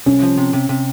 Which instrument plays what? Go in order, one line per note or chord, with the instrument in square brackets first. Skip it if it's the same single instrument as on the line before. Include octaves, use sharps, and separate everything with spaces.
[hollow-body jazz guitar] C2 [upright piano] C#4
[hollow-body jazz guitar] F3
C3
C3
C3